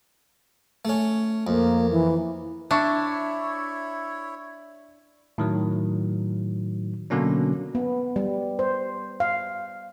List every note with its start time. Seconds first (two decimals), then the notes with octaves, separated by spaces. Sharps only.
0.85 A3 C#4
1.47 F2 A#3
1.91 E3
2.71 D4 E4 C#5 E5 C#6
5.38 A2 D#3 F#3
7.10 B2 D3 F#3 A#3 C#4 D4
7.75 B3
8.16 G3
8.59 C5
9.20 F5